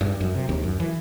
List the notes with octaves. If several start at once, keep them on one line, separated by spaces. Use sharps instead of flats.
G2
F#2
C3
D#2
F#2
E3